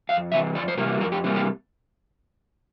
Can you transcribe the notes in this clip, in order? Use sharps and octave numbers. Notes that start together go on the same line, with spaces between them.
F2 F5
C3 E3 E5
F2 D5
C5
C3 E3 G3 A#3 A#4
F2 A#4
G4
C3 E3 G3 A#3 C4
G4